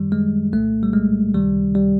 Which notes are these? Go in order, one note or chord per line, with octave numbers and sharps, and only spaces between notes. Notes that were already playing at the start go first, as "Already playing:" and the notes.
Already playing: F#2 D#3 G3
G#3
C2 A#2 A3
G3
G#3
C#2 C3 D#3 G3
G3